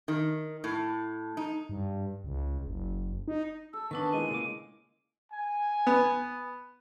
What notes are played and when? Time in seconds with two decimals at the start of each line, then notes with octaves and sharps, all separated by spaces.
0.08 D#3
0.64 A2
1.37 D#4
1.69 G2
2.24 C#2
2.67 F#1
3.28 D#4
3.73 A4 E6
3.91 D#3 B3 C#4 D4 B4 A5 C#6
4.13 A#2 G#3 E4 D#7
4.31 C#3 A#3 D6
5.33 G#5
5.87 B3